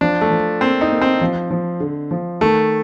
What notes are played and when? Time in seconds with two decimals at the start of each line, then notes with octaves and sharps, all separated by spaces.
0.01 F3 D4
0.21 A3
0.31 F3
0.61 A#3 C4
0.81 D#4
0.90 A#3
1.02 C4
1.21 F3
1.51 F3
1.80 D3
2.11 F3
2.41 D#3 A3